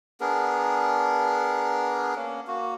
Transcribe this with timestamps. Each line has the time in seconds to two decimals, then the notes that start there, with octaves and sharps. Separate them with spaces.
0.21 B3 D4 G#4 A#4
2.16 A#3 C#4
2.47 A#3 F#4